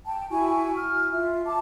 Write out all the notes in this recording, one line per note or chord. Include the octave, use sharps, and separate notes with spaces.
G5 A5
E4 F#4 G#5 C#6
F6
F4 E5
A5 D6